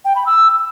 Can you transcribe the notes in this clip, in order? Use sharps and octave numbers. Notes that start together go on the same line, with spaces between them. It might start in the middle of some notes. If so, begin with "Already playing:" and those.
G5
B5
E6